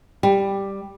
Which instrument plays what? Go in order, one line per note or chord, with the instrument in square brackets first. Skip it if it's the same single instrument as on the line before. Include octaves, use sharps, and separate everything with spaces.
[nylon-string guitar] G3